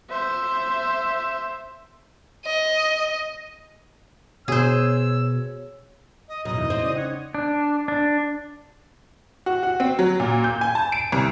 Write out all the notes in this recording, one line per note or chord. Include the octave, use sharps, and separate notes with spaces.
C5 E5
D#5
B2 G#4 C5 C#5 E6
D#5
F#2 B2 D#5
E2 D#4 E4
C4
C#3 D5
D#4 C#5 F#5
D4
D4
F#4
F#4
C4
F#3
A#2
G6
G#5
A5
D7
C2